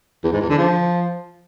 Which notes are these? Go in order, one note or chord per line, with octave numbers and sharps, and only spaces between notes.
E2
G#2
E2
D3
F3